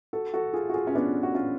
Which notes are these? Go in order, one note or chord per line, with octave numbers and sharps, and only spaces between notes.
F#4 A4
F#4 A4
F4 G#4
F#4
F4 G#4
C#4
B3 D4
F#4
C#4 F4